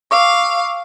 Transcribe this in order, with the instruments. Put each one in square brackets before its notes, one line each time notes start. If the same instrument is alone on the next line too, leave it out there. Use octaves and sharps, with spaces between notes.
[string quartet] F5 [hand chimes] C#6 D6 E6